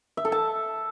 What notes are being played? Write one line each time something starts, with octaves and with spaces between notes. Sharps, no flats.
E5
A4
A5